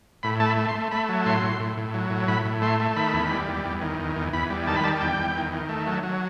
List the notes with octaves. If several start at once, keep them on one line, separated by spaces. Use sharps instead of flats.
A2 B5
A3 A5
B5
A3
C6
A3
A3 B5
F#3
A2 C6
A2
A2
A2
F#3
A2
A2 B5
A2
A3 C6
A3
D#3 B5
E2
G3
E2
E2
D#3
E2
E2
E2 B5
G3
D#3 A5
B5
G3 A5
A5
E2 G5
E2
D#3
D#3
A3
F#3
F#3